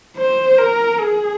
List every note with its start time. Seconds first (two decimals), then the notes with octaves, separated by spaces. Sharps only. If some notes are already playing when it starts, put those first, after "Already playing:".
0.17 C5
0.58 A#4
0.99 G#4